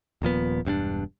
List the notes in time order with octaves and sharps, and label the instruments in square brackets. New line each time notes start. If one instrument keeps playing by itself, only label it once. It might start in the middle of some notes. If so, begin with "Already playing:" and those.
[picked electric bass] D#1 A#2 F3 B3
E1 G2 C4 D4